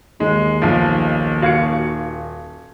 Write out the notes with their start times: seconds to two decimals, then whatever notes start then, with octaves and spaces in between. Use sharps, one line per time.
0.20 D#2 G#3
0.62 B1 F3
1.42 D#1 F#4 F5 G#6 C#7